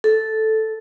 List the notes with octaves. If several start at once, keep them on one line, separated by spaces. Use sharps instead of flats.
A4